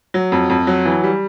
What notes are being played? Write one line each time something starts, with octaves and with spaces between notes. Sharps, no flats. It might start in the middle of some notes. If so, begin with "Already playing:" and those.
F#3
F2
F2
F#3
E3
G3